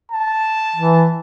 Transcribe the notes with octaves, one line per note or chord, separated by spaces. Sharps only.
A5
E3